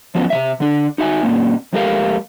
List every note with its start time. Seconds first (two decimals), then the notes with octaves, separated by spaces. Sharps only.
0.15 F3 F#3 B3 C#4
0.30 C3 D#3 E5
0.60 D3 D4
0.98 D#4 F#4 E5 G#5
1.23 A#2 D#3 A#3 C4 C#4
1.73 F2 G#3 A3 G4 A#4 F5